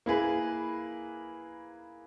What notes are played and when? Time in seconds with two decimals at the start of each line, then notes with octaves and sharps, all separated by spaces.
0.06 A#3 E4 G#4 B4